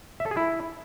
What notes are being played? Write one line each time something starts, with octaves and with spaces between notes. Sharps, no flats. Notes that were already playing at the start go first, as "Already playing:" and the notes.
E5
A4
G#4
E4